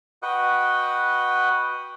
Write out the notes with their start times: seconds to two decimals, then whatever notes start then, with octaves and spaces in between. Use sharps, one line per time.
0.23 F#4 B4 D#5 F#5 G5